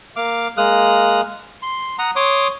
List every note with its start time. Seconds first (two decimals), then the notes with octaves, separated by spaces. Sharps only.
0.16 A#3 F5 D6
0.57 G#3 A#3 D#6 F6 F#6
1.63 C6
1.99 F#5 A#5 D#6
2.16 C#5 C6 D6 D#6